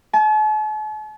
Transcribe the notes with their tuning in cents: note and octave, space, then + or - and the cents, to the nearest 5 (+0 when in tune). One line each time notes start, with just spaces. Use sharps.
A5 -45